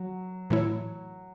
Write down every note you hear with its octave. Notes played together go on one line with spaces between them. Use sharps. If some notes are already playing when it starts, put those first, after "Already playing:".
Already playing: F#3
A2 E3 A3 E4 C#5